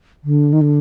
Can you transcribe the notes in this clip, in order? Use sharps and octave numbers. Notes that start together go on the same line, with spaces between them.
D3
D#3
D3